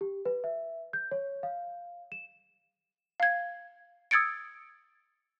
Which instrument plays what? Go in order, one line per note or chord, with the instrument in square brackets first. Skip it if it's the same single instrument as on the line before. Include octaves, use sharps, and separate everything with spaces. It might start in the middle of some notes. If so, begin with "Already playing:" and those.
[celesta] G4
B4
E5
G6
C#5
F5
E7
[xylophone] F5 G#6
D#6 E6 G#6 A6 C#7 D7